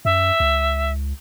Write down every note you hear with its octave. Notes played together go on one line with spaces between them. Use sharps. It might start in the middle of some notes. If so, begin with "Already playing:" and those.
F#2 E5
C#2